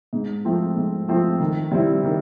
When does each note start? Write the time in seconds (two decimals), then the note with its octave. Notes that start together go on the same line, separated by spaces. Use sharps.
0.13 G#2
0.45 F3 A3 C4 F4
0.76 G#2
1.08 F3 A3 C4 F4
1.40 D#3
1.71 G3 C4 E4
2.03 D#3